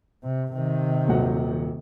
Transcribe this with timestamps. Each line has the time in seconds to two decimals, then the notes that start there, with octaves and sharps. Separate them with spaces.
0.23 C3
0.53 C3 D#3
1.08 D#1 F#3 F#5